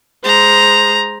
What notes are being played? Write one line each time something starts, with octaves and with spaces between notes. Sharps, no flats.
G#3 C5 A#5